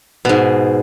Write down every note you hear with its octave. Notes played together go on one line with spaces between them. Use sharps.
G#2 B2